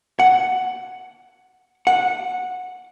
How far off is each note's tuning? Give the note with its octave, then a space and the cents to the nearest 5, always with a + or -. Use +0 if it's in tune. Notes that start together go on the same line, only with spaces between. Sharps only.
F#5 +5
F#5 -15